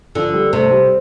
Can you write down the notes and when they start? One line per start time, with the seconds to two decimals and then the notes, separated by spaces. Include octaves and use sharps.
0.15 D3 F3
0.33 G3
0.53 C3 A3
0.71 G3